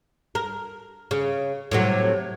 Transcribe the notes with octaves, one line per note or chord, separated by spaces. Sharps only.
A#4
C#3
A2 C3 F#3